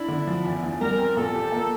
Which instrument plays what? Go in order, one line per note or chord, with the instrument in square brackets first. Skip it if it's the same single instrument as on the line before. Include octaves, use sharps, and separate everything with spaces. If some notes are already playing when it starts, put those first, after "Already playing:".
Already playing: [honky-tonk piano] D4 [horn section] E4
[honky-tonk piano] D3
F3
E2
E2
[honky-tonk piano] G3 [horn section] A#4
[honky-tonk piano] C4
[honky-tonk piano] A#2 [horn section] A4
[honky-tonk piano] G4
A#3